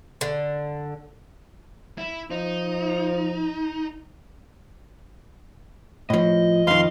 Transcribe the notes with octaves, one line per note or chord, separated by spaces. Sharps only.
D3
E4
F3 D#4
A2 F3 D#5
F2 D#3 F5 C6